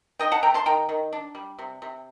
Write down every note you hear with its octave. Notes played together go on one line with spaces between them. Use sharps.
D#4 D#5 G5
F#5 A5
A3 G5 A#5
A5 C6
D#3 G5 A#5
D#3
D4
G3
C3
C3